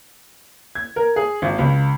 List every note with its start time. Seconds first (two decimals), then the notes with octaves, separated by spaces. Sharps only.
0.75 G#6
0.96 A#4
1.16 G#4
1.42 G#1
1.59 C#2